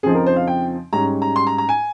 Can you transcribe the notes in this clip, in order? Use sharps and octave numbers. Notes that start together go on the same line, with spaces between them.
F2 C#3 F3 C4 D#4 G#4
A#4
C5
F5
G5
G#2 G3 C#4 A#5
A#5
C6
A#5
A#5
G#5